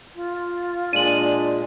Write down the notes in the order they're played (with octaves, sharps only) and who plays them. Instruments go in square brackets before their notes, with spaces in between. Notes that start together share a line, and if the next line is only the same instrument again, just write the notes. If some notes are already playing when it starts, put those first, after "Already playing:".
[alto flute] F4
[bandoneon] A#2 G#3 [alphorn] D4 [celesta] D#7 F#7